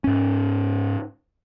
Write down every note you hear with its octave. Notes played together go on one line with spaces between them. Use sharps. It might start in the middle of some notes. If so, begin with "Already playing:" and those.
G#2 C#4